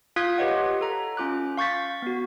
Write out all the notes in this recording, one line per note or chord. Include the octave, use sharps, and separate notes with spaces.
F4 F5 D#6 F#6 G#6 B6
G4 B4 C#5 D#5 F#5
A4 A#5
C#4 F4 D6 F#6
F5 C#6 G6 A6 B6
B3 F#4